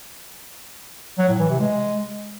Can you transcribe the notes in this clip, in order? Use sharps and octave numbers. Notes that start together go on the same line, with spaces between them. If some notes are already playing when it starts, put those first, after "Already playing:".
F#3
A2
E3
C3
G#3